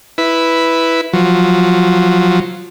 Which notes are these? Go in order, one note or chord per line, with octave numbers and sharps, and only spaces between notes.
E4 B4
F3 F#3